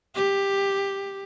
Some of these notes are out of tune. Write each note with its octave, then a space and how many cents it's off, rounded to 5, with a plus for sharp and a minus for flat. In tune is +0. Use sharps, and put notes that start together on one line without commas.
G4 +10